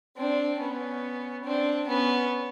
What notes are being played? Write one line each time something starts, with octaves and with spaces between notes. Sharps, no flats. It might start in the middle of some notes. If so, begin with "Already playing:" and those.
C4 D4
B3 C#4
C4 D4
B3 C#4